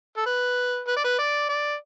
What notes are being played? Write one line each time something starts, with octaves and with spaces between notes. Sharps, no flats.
A4
B4
B4
D5
B4
D5
D5